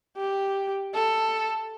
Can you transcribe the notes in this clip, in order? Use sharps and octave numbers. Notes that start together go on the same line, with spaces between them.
G4
A4